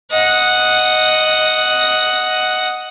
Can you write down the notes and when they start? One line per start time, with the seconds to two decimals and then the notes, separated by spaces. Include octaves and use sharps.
0.12 D#5 F#5